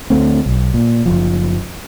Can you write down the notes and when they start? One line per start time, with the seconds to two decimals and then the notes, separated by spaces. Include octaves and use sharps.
0.10 D2 A3 C4
0.46 B1
0.74 A#2
1.06 F#1 B1 F3